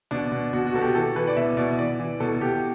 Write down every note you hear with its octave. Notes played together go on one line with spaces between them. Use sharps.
B2 D4
B2
B2 F#4
F#4
B2 A4
G4
E3 A4
E3 B4
D5
B2 E5
B2 D5
E3 D5
E3
B2 A4
B2 G4